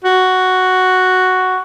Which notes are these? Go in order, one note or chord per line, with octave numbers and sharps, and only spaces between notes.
F#4